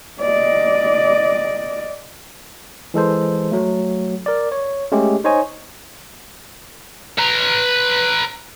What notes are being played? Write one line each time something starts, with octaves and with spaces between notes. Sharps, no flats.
D5 D#5
E3 G#3 A4 C5
F#3 A3
A#4 D5
C#5
G#3 A3 C#4 G4
D#4 C5 C#5 D#5 G#5
B4 A#5